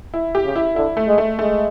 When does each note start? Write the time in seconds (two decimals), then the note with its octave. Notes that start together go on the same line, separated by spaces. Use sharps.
0.14 E4
0.35 G4
0.44 C#3
0.56 E4
0.76 D3 E4
0.97 A3
1.08 G#3
1.18 A3
1.39 G#3 A3